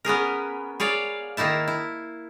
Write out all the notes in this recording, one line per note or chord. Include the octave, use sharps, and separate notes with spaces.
B3 C#4 G#4 A#4
G#4 C#5 D5 F5
D#3 A#3 D#4 E4 A5
E4